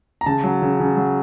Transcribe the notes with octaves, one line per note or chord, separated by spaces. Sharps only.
A#5
C#3 A5
F#3
C#3
C#3
F#3